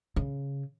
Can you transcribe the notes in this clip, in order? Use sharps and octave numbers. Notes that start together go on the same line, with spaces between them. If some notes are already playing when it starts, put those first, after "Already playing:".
C#3